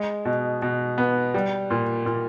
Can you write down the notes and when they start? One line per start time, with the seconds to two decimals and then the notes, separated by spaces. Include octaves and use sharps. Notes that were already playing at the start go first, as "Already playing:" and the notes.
Already playing: G#3
0.25 B2
0.62 B2
0.98 B3
1.34 G3
1.71 A#2
2.06 A#2